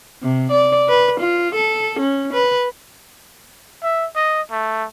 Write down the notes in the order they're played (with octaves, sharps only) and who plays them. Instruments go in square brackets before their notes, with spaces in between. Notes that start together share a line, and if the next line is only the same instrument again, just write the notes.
[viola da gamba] C3
D5
B4
F4
A4
C#4
B4
[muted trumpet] E5
D#5
A3